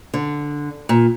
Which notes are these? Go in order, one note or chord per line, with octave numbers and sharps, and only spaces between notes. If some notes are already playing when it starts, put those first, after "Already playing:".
D3
A#2